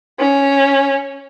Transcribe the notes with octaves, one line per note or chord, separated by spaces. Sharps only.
C#4